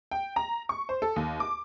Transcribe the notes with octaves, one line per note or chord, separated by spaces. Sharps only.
G5
A#5
C#6
C5
A4
D#2
D6